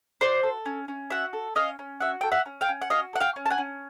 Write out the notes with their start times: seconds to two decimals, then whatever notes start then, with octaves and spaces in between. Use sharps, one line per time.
0.21 F#4 C5 D5
0.43 A4
0.66 C#4
0.88 C#4
1.10 F#4 E5 F#5
1.33 A4
1.55 C#4 D#5 F5
1.79 C#4
2.00 F#4 E5 F#5
2.21 A4 G5
2.32 E5 F#5
2.46 C#4
2.61 F5 G5
2.69 C#4
2.82 F#5
2.90 F#4 D#5 F5
3.13 A4 F#5
3.20 F5 G5
3.36 C#4
3.46 A5
3.50 F#5 G#5
3.58 C#4